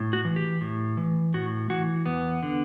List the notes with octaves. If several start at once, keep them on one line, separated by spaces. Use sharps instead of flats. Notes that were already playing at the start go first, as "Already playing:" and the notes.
Already playing: A2
F#4
E3
G4
A2
E3
A2 F#4
E3 F#4
E2 B3
D3